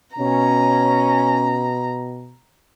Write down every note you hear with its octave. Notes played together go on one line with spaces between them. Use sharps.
B2 C#4 A#5